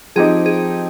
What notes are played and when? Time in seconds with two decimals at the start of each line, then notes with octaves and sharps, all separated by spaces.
0.16 F3 C4 D#4 G4 G#4
0.46 G#4